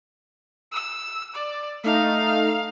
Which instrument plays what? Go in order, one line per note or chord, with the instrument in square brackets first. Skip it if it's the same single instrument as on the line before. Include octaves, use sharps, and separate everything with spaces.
[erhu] E6
D5
[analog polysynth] A3 D#4 [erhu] F5